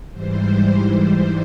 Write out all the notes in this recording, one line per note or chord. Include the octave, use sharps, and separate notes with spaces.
G#2 E3 G3 C5
C5